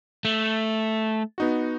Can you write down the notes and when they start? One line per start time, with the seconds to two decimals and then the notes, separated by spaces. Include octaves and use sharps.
0.25 A3
1.38 B3 D#4 F#4